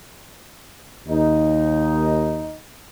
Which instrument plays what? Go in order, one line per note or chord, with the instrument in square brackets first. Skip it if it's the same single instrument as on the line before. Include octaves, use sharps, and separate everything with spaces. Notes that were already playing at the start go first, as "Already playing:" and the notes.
[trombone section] D#2 D#4